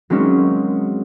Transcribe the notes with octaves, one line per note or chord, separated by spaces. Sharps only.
F#3 G#3 A#3 C4 C#4 D#4